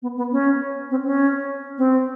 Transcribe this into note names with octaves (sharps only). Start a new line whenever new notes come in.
B3
B3
C#4
C4
C#4
C4